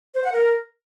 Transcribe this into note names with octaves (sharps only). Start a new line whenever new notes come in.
C5
F#5
A#4